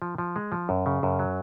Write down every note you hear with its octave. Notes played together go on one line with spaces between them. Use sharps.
F3
F3
G#3
F3
F#2
C#3
F#2
F#3